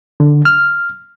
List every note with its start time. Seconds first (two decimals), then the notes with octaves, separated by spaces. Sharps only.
0.20 D3
0.45 F6